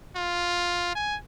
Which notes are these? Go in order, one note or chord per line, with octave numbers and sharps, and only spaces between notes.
F4
G#5